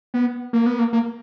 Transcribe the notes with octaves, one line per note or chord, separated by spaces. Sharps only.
B3
A#3
B3
A#3
A#3